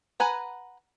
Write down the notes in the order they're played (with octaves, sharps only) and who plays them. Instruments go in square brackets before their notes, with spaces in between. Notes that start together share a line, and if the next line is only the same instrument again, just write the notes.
[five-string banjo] B4 F#5 G#5 A#5